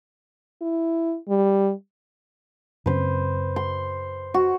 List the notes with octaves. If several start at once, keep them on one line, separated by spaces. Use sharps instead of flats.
E4
G3
F#2 C#3 C4 B4 C5
C6
F#4